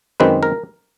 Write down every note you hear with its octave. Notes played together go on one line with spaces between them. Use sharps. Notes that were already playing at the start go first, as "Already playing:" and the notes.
F#2 D#3 G#3 C4 B4
A#4